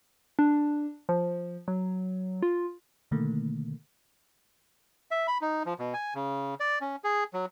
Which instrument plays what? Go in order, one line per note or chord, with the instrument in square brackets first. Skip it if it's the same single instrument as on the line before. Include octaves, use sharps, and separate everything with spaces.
[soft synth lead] D4
F3
F#3
F4
[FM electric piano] B2 D3 D#3 A3 A#3
[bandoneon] E5
B5
D#4
F3
B2
G#5
C#3
D5
C#4
G#4
F#3